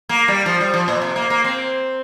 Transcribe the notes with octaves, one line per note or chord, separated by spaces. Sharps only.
A#3
G3
F3
G3
F3
A#2
C3
A#3
A#3
C4